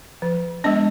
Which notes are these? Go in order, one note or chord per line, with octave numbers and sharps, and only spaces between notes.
F3
G#3 B3 D4 D#5